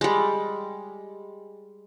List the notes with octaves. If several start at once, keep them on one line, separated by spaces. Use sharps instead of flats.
G3 G#3